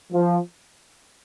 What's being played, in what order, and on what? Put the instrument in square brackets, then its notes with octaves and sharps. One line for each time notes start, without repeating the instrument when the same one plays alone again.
[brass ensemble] F3